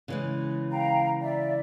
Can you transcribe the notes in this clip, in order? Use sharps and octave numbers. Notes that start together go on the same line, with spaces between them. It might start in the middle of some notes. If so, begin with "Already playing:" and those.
C#3 E3 G#3
F5 G5 A#5
D5 E5